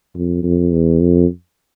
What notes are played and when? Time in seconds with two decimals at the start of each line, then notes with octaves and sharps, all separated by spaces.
0.15 F2
0.43 F2
0.72 E2
1.00 F2